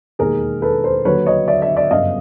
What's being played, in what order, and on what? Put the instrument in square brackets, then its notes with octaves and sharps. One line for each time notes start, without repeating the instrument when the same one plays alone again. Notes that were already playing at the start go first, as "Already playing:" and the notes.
[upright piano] E1 D#2 D#3 G#4 A#4
A4 B4
A#4 C5
D#2 D3 F#3 B4 C#5
C#5 D#5
D5 E5
D5 E5
D5 E5
G1 F#2 C#3 D#5 F5